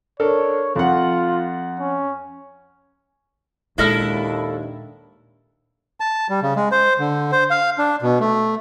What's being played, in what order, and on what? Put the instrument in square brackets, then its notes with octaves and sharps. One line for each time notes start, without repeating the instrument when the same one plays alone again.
[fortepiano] D4 A4 A#4 [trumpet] C#5
[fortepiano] F2 F#5 [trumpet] F4
[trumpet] C#4
[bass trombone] D#2 [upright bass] A#2 G#3 [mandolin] D4 D#5 F6 [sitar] E4 A4
[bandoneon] A5
G3
C#3
G#3
C5
D3
C5
F5
D4
B2
A3